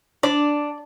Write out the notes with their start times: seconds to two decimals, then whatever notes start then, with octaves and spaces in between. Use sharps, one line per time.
0.23 D4 D5